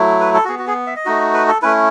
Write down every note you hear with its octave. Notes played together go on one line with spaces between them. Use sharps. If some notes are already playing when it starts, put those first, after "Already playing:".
Already playing: F#3 A3 E4
B4
A4
B3 F#4 G#4
F#4
G#4
E5
D#5
A3 D#4 F#4
B4
A4
A3 C#4 E4 B4